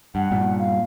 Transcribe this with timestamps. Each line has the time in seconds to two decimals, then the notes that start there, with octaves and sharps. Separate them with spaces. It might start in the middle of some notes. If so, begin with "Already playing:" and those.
0.15 G2 F#5
0.31 G2 A#2
0.59 F5